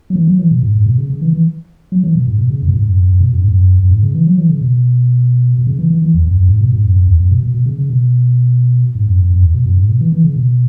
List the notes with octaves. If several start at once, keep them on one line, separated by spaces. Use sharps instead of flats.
F#3
E3
F#3
E3
B2
G#2
G#2
B2
C#3
C#3
E3
E3
F#3
E3
B2
G#2
B2
C#3
F#2
B2
G#2
F#2
F#2
F#2
B2
F#2
G#2
F#2
F#2
G#2
C#3
E3
F#3
E3
C#3
B2
B2
C#3
E3
E3
E3
E2
F#2
F#2
G#2
B2
G#2
F#2
F#2
E2
F#2
B2
B2
B2
C#3
C#3
B2
G#2
F#2
F#2
F#2
E2
B2
F#2
G#2
B2
E3
E3
C#3
B2